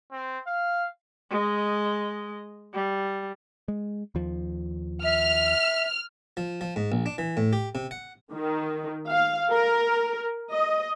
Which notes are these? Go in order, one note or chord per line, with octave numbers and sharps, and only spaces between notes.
C4
F5
G#3 D#5
G3
G#3
D#2 F3
E5 F6
F3
F3
G#2
A#1
D4
E3
A2
G4
C3
F#5
D#3
F5
A#4
D#5